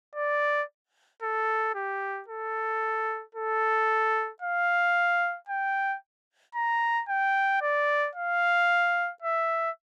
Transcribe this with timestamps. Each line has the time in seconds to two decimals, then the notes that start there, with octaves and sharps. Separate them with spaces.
0.15 D5
1.22 A4
1.75 G4
2.28 A4
3.35 A4
4.42 F5
5.49 G5
6.55 A#5
7.09 G5
7.61 D5
8.15 F5
9.22 E5